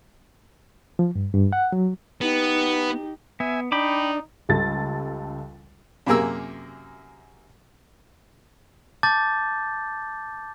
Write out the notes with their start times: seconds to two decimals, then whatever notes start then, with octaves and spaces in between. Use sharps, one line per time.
0.99 F3
1.16 G2
1.34 G2
1.53 F#5
1.72 F#3
2.21 B3 D#4 G4
3.40 B3 E5 G#5
3.72 D4 D#4 G5 B5 D6
4.49 C#2 G3 A4 A6
6.06 F#2 C3 A#3 G#4 A#4 E6
9.03 A5 D6 G6 A6